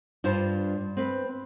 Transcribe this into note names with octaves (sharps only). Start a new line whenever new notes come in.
G2 F4 C5 A5
C4 B4